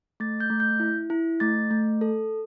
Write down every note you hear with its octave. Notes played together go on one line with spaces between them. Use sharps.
A3 A6
G6
A3
G6
E4
E4
A3 A6
A3
A4